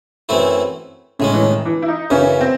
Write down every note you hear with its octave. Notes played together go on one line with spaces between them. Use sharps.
F#2 E3 A3 C4 E4
A2 C#3 G#3 C#4
E3
D#3
E3
E4
D#4
F#2 C#3 E3 C#4
C4